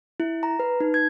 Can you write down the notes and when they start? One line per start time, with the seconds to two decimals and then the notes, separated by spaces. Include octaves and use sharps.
0.20 E4
0.43 A#5
0.59 B4
0.80 D#4
0.94 G#6